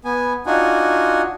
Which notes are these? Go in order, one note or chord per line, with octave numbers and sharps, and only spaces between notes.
B3 G#5
D4 D#4 F4 F#4 F#5 G#5